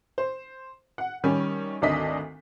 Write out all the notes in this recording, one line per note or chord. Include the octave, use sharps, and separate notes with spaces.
C5
F#5
D#3 G3 C#4
G#1 D2 D4 D#5 B6